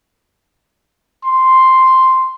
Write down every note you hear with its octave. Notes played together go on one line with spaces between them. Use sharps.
C6